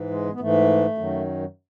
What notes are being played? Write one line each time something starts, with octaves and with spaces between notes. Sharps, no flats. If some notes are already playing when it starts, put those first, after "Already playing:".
Already playing: G#2 E3
G#3
B3
G#2 E3 A3
F#2 D#3 F#3